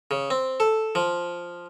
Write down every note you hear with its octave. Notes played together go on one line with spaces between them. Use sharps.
C#3
C4
A4
F3